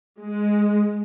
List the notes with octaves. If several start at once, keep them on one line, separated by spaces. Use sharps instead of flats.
G#3